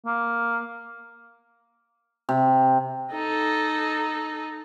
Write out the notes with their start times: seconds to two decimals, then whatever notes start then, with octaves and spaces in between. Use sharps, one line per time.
0.06 A#3
2.29 C3
3.12 D#4 A4